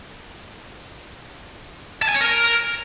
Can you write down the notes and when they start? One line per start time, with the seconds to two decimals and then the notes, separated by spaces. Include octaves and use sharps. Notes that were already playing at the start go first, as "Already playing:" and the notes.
2.02 A5
2.08 G#5
2.14 C#5
2.21 A#4